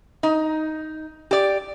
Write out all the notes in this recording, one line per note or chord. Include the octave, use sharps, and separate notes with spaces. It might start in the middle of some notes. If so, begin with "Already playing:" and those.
D#4
G4 D5